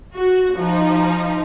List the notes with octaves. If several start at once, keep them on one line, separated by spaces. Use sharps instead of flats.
F#4
F3 D#4